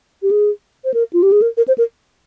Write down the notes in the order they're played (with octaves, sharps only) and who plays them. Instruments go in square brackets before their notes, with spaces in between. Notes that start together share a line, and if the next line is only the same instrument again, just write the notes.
[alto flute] G4
G#4
C5
A#4
F4
G4
G#4
A#4
A#4
C5
A#4